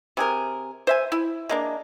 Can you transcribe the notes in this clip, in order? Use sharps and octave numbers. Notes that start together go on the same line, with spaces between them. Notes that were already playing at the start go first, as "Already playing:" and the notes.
C3 G#4 A#4
C5 E5 G#5
E4
G#3 A#3 D4